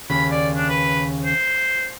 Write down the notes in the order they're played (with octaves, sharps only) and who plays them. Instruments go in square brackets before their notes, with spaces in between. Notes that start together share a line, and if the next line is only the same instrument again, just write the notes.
[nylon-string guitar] D#2 C#3 [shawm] B5
[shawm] D5
D4
B4
C5